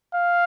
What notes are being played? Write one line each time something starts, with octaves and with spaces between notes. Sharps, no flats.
F5